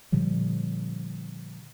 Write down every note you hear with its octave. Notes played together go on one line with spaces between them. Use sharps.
A#2 D3 F3 G3